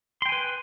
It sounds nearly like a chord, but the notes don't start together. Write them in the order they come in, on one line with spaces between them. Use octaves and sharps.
C6 G5 G#5 B4